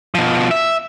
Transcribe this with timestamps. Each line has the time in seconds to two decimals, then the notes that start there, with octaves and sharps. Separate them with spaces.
0.15 B2 F3
0.51 E5